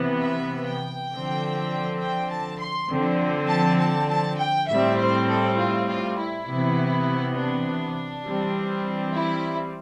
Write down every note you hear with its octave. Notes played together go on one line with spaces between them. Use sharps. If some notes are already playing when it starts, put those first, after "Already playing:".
Already playing: C3 E3 B3
E5
G5
D3 F3 C4
G5
A5
C6
D3 F3 C4
A5
A5
A5
G5
A2 G3 C4 E5
C5
A4
F4
F4
E4
C3 E3 B3
D4
E3 G3 C4
E4